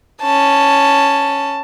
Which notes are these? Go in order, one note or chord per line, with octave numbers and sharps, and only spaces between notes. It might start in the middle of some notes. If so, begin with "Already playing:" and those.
C#4 A5